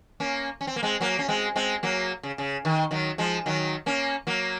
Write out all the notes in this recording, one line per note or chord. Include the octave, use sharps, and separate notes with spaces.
A#3 C#4
C#4
C4
A#3
G#3 C4
F#3 A#3
C#4
G#3 C4
G#3 C4
F#3 A#3
C#3
C#3
D#3
D#3 F#3
F3 G#3
D#3 F#3
A#3 C#4
F#3 A#3